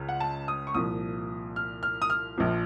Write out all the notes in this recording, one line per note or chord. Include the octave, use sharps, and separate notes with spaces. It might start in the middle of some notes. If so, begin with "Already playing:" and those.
Already playing: C#2 C#3
F#5
A5
D#6
C#6
C2 A#2 F3 D#6
F6
F6
D#6
F6
A#1 A#2 F3